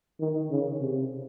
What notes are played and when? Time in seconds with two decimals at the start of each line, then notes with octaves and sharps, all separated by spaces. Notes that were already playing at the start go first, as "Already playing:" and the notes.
0.20 D#3
0.50 C#3
0.80 C3